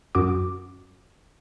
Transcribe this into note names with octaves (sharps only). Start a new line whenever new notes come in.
F#2 F#4 D6